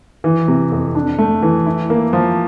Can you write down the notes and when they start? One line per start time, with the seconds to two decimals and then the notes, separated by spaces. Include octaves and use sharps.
0.24 E3
0.48 C3
0.72 F2
0.95 D4
1.19 A3
1.42 E3
1.66 E4
1.90 A#3
2.13 F3